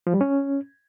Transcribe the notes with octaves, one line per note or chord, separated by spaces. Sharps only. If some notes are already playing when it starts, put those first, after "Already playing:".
F3
G3
C#4